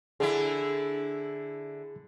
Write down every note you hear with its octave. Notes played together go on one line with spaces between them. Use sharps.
D3 E4 G#4